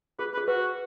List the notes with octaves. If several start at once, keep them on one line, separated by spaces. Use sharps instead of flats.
G#4 B4
B4
G#4
F#4 B4